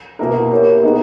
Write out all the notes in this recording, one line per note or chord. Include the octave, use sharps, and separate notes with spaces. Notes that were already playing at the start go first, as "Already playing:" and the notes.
B2 A#3 E4 A#4
A#3 E4 G4 A#4 C#5
B3 D#4 G#4 D#5